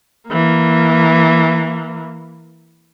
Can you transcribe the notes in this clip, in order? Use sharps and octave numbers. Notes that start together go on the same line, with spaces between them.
E3 A#3